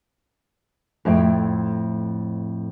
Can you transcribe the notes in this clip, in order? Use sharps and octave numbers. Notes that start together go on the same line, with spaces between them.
F2 A2 G5